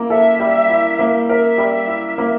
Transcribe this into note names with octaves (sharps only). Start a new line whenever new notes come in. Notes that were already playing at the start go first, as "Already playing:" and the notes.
Already playing: A#3 E4
A4 E5
G3
E4
A#3
A#4 E5
G3
E4
A#3